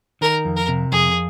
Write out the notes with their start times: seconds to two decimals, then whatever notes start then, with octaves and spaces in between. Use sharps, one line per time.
0.21 D#3 A#4
0.45 F2
0.56 A#4
0.68 C3
0.92 F2 G#4